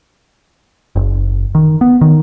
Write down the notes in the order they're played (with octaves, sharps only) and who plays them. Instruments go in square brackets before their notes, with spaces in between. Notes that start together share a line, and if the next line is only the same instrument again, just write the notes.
[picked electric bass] F#1
D#3
B3
D#3